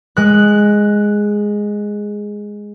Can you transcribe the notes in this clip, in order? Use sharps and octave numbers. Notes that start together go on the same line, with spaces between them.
G#3 F#6